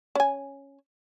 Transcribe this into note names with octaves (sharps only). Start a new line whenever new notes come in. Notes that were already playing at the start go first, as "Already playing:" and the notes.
C#4 G#5